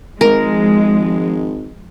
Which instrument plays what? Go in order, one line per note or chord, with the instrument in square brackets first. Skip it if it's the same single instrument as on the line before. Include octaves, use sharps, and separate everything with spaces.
[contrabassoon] G#1 [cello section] F3 G#3 [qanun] A#4